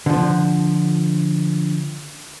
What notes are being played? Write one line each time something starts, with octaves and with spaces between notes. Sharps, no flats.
D3 F3